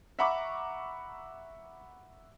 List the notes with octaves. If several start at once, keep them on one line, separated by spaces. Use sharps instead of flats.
E5 F#5 A#5 B5 C#6 D6